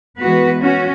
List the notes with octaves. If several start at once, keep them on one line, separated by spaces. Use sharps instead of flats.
E3 G#3 B3 F#4 B4
C#4 F#4